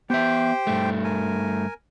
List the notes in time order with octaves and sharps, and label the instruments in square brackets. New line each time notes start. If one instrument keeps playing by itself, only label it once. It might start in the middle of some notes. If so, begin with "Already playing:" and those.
[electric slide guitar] B3 E5 [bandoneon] G4 C5 G5
[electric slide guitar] G2 A3
[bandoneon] A#4 G#5